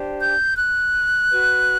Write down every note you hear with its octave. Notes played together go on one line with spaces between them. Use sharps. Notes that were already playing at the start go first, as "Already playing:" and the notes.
Already playing: D4 G4 C5
G6
F#6
F#4 B4